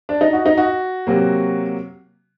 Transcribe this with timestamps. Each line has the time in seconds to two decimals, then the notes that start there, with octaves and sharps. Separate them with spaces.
0.09 D4
0.21 D#4
0.33 F#4
0.46 D#4
0.57 F#4
1.07 C3 F#3 A#3